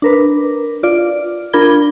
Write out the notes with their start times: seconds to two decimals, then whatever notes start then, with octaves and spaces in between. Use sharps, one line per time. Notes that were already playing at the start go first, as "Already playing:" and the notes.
0.02 D4 A#4 B4
0.83 F4 D5
1.53 D4 F4 A#4 B5 G#6 G7